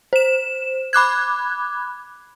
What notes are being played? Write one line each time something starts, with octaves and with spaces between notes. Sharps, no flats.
C5 E7
B5 D6 F#6 G#6